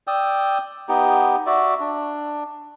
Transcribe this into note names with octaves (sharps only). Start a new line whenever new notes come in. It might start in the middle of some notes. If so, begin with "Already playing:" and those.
D5 G5 D#6 E6
B3 D#4 G4
F#4 D5 E5
D4